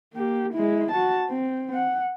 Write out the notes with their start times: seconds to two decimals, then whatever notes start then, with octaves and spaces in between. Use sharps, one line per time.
0.14 A#3 G4
0.53 G#3 E4
0.91 F#4 A5
1.30 C4
1.74 F#5